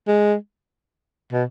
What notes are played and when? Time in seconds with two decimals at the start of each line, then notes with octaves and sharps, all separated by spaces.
0.08 G#3
1.32 B2